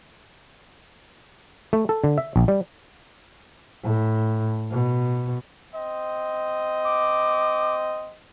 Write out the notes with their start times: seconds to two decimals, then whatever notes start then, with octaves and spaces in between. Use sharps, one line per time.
1.73 A3
1.89 A4
2.04 D3
2.18 E5
2.36 A#1
2.48 G3
3.84 A2
4.71 B2
5.73 C4 D#5
6.85 D6